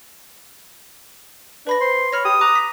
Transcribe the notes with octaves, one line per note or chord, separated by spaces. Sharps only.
D4 B4 B5 A#6
C5 C6
C#5 B5 F6 A#6
G4 D#6
A#5 D6 F#6
B6